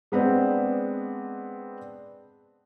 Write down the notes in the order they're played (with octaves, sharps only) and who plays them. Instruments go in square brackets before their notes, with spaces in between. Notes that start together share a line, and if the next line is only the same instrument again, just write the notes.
[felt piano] G#3 B3 C4 D4